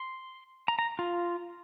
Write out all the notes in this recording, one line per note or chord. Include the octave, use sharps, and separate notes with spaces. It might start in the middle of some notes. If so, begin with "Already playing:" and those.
Already playing: C6
A#5
A#5
F4